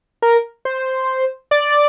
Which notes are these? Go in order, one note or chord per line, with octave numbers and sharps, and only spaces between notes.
A#4
C5
D5